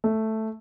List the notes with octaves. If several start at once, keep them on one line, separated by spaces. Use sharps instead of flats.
A3